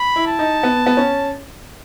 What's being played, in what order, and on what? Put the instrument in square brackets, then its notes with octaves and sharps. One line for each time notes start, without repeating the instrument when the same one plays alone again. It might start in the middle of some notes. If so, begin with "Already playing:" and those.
Already playing: [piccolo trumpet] B5
[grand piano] E4
[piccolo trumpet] A5
[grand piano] D#4
B3
B3
C#4